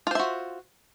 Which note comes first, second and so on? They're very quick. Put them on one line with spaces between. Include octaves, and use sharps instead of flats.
F4 C5 E5 F#4